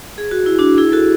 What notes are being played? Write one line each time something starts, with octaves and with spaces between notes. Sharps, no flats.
G#4
F#4
E4
D4 F#4
E4 G#4
F#4 A4